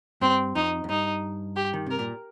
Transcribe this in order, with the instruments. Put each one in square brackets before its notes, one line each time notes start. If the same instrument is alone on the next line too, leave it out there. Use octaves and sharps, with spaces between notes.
[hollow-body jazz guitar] G2 [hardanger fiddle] C4
[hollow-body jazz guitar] F2 [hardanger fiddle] D#4
[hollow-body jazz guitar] F2
[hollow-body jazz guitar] G2 [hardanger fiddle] D#4
[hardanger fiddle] G4
[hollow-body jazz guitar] D#3
[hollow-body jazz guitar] C3 [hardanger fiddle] A#4
[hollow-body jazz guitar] A#2